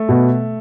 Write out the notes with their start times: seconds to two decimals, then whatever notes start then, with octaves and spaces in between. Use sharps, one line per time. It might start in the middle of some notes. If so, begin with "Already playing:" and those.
Already playing: A3
0.09 B2